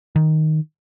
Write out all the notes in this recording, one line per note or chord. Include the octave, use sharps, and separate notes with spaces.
D#3